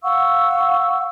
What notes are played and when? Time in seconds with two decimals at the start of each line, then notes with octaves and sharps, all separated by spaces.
0.03 F5 F#5 C#6 E6